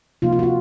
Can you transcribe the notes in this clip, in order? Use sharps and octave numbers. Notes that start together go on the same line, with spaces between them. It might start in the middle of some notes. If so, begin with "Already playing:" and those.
C3 F3 A#3 D#4 F4
F4
F#4
F4